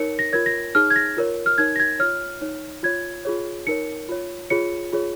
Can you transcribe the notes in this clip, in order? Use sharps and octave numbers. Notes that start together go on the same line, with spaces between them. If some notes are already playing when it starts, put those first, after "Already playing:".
Already playing: D#4 A#4 C#5 C#7
A#6
F4 A#4 C#5 G#6
A#6
D#4 G#4 C#5 F6
G#6
A#6
F4 A#4 C#5
F6
D#4 A#4 C#5 G#6
A#6
G#6
F4 C#5 F6
D#4 C#5
F4 C#5 G#6
F4 G#4 C#5
D#4 A#4 C#5 C#7
F4 C#5
F4 G#4 C#5 C#7
F4 G#4 C#5